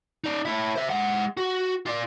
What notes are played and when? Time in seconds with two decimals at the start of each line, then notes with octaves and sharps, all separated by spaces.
0.24 D#4 D5
0.45 E4 C#5
0.76 C5 E5
0.90 G#3 F#5
1.37 F#4
1.86 F4 D5